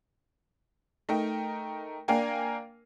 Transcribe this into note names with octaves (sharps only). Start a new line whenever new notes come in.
A3 D#4 A#4 G5
A#3 D4 A#4 F5 G5 G#5